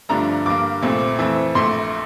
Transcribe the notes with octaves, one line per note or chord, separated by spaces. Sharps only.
G2 D3 F3 A3 D4 A#5
G2 D3 G3 A#3 D6
C2 A#2 A3 C4
F2 E3 A3 C4
A#1 A#2 A3 C6